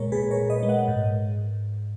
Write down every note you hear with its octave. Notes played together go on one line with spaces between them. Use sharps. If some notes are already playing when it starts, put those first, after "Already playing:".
Already playing: A#2 G#3 A#4 C#5
A#2 G#4 B4
A#4 C#5
A#2
B4 D#5
G#3
D#5 F#5
G#2